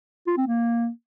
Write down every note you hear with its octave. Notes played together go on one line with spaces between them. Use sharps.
F4
C4
A#3